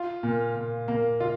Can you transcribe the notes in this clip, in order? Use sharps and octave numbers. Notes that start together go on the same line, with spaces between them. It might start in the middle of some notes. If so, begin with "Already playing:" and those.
Already playing: F4
A#2
A#2
A#3
F4